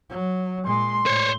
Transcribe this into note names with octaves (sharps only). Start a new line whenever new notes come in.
F#3
A#2 G#3 C6
A2 C5 C#5